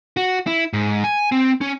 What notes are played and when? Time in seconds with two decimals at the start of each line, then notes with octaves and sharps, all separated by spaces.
0.17 F#4
0.47 E4
0.73 G#2
1.04 G#5
1.32 C4
1.61 C#4